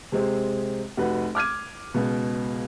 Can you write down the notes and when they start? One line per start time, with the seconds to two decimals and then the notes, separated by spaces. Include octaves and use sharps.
0.12 C3 G#3 C4
0.97 F1 F#4 B4 F#5
1.35 D6 F6 G#6 D#7
1.94 C#2 B2